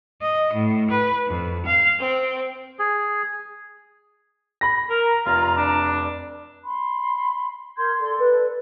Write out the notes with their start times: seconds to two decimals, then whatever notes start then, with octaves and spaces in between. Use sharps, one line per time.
0.22 D#5
0.54 A2
0.90 B4
1.28 F2
1.65 F5
2.00 C4
2.79 G#4
4.61 B5 A#6
4.90 A#4 A#5
5.26 F1 F4
5.57 D4
6.64 B5 C6
7.77 A#4 C6 G6 G#6
7.99 A4 D5
8.20 B4